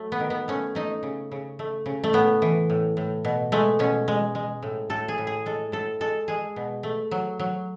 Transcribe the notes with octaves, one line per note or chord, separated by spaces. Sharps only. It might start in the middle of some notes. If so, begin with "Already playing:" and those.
Already playing: F#3 A3
B3
D#3
B3
A3 C#4
A3 D#4
C#3
C#3
A3
C#3
A3
A2 B3
E3
A2
A2
B2
G#3 A3
B2 C#4
G#3
G#3
A2
A2 A4
G#4
A2
G#4
G#3 A4
A2 A4
G#3 A4
G#3 G#4
B2
A3
F#3
F#3